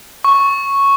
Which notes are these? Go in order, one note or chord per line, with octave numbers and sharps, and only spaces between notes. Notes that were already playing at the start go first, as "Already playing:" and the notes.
C#6